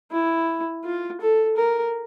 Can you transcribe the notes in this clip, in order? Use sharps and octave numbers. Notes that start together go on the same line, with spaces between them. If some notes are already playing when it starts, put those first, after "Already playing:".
E4
F4
A4
A#4